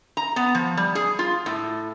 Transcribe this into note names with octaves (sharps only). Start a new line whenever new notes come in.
A#5
B3
F3
G3
G#4
F4
A2